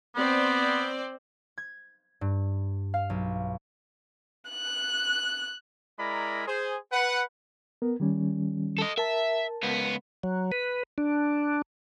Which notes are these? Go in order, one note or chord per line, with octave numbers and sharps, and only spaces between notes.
B3 C4 C5 D5
G#6
G2
F5
B1
F#6
G#3 E4 A#4 D5 A#5 B5
G#4 C5
B4 F#5
B3 A#4
D#3 G3 C#4
A4 D#5
A#4 E5 A5
C#2 B3
F#3
B4
D4